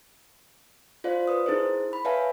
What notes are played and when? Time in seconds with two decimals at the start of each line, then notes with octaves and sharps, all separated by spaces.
1.04 F4 C5 D5 F5
1.27 B4 D#6
1.46 D#4 E4 G#4 A#4 C5
1.93 B5
2.05 B4 C#5 E5 F5 G#5 A5